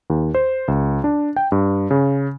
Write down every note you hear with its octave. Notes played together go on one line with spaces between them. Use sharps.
D#2
C5
C#2
D4
G5
G2
C#3